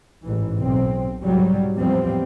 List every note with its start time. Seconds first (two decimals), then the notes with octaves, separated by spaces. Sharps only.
0.24 A1 G#2 E3
0.58 B1 C4
1.23 C2 G#2 F#3 G3
1.75 E2 A2 F3 G3 B3 C4